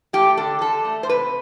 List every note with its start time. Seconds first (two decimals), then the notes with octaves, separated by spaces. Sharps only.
0.13 A3 G4
0.37 D3 A4
0.61 D3 A4
0.85 A3
1.03 C5
1.09 C3 B4